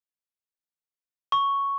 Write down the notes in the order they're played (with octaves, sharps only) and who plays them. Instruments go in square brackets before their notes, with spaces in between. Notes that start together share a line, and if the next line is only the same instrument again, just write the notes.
[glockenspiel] C#6